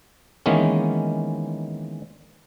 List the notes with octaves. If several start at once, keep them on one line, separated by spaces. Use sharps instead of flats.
D#3 E3 G#3 A#3 B3 C#4